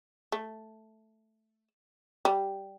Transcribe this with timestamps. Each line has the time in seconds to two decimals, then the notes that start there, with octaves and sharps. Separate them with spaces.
0.32 A3
2.25 G3